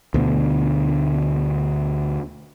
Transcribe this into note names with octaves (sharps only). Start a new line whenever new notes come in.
D2 B2 D3